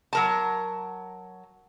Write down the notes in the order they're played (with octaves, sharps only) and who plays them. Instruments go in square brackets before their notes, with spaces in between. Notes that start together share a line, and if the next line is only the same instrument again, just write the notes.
[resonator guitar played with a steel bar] F#3 A#4 A5